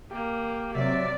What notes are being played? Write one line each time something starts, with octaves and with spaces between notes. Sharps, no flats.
A#3 G4
C3 F#3 D5 E5